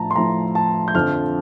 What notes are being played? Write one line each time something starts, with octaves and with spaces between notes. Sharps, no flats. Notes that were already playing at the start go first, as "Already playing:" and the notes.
Already playing: A2 F3 A5 A#5
C6
A2 F3 A#5
A5
G6
F2 D3 F3 F6